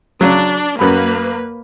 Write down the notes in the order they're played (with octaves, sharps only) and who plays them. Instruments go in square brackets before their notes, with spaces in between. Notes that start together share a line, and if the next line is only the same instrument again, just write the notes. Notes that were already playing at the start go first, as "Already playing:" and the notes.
[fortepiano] C#3 F#3 [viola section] D4
[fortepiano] F#2 B5 [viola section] A#3 B4